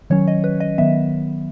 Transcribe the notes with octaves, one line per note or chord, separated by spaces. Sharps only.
D#3 F#3 C#4 C#5
D#5
B4
D#5
D#3 F#3 B3 E5